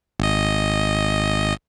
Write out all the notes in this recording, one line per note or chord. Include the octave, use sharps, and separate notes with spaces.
G#1 D#5